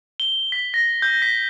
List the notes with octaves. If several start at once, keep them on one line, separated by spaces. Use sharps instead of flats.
G7
B6
A#6
G6
B6